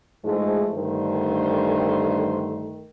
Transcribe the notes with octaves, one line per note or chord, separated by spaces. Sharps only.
G#2 E3 F3 G#3 A3
G2 D3 D#3 A3 C5